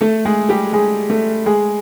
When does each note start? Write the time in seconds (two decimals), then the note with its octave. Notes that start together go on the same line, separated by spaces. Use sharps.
0.01 A3 A4
0.25 G#3 G#4
0.49 G3 G4
0.73 G#3 G#4
1.10 A3 A4
1.46 G#3 G#4